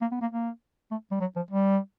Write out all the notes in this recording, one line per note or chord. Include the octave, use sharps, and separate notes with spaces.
A#3
B3
A#3
A#3
A3
G3
F#3
F3
G3